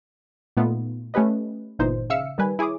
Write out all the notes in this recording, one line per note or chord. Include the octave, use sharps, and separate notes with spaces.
A#2 A3 B3 D#4 F4
A3 C#4 G4 B4 D#5
G1 A#2 E3 D#4 C5
C#3 E5 F5 E6 C#7
D#3 G3 B4 G#5
E4 G#4 C#5 D6 D#6